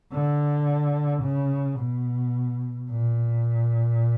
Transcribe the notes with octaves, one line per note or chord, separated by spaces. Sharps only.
D3
C#3
B2
A#2